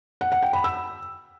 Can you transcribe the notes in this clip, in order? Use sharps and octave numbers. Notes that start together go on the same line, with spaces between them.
F#5
F#5
G5
B5
E6